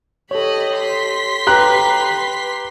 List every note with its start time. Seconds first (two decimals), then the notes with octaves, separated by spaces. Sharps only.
0.31 G4 A4 C#5 D#5 B5
0.75 C6 B6
1.47 G4 B4 A#5 F#6